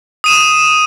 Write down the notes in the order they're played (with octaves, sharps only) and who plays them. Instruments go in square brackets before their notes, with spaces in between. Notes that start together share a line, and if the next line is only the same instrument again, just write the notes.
[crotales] D#6 D#7 E7